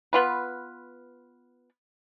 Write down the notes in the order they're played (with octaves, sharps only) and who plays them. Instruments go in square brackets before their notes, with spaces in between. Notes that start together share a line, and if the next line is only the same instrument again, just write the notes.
[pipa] B3 F4 B4